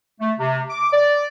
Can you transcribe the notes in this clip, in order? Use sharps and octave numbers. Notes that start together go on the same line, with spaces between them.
A3
C3
D6
D5